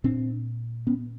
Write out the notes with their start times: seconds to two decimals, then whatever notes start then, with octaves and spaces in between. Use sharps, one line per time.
0.04 A#2 C4 D4
0.87 B3 C#4